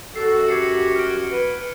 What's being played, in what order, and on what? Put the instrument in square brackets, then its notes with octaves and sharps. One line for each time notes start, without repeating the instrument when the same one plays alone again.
[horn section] F#2 F#4 [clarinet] A4 [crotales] C7
[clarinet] G4 [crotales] G#6 C7 C#7
[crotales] F6 D7
[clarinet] B4